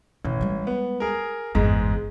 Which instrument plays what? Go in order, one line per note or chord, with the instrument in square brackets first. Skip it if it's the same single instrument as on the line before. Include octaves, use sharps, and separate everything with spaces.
[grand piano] A1 [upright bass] B2 D#3
[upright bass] G3 G#3
[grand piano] B3
G#4 A#4
[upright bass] G1 E2 [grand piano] G#2 G#3